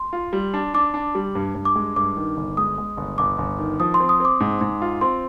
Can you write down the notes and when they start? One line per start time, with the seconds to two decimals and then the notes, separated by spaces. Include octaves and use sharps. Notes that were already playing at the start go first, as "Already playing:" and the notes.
Already playing: C6
0.13 F4
0.33 G3
0.54 D4
0.74 D4 D6
0.94 D4
1.15 G3
1.35 G2
1.55 G2
1.65 D6
1.76 G#3
1.96 G2 D6
2.17 D#3
2.37 G1
2.57 G#3 D#6
2.78 G#3
2.97 G1
3.18 G1 D6
3.38 G1
3.58 D#3
3.80 F3 D#6
3.94 C6
4.00 C4
4.09 D#6
4.20 C4 D6
4.40 G#2
4.61 G#2
4.82 F4
5.01 C4 C6